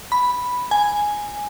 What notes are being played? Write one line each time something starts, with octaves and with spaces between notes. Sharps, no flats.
B5
G#5